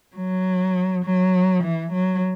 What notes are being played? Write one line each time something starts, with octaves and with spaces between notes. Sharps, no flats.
F#3
F#3
E3
F#3